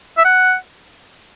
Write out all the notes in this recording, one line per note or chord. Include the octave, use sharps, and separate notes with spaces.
E5
F#5